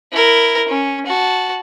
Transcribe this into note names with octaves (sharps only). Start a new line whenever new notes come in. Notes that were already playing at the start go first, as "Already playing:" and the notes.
E4 A#4
C#4
F#4 A5